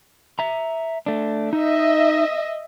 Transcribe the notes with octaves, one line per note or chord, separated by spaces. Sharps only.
E5 A#5
A3 D4
D#4 D#5 E5